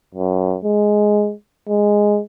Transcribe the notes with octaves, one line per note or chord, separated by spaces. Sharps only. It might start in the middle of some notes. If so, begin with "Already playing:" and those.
F#2
G#3
G#3